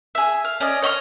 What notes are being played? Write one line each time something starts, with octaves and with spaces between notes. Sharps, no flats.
G#4 E5
F5
C#4 D5 D#5
C#5 D#5 C#6 F6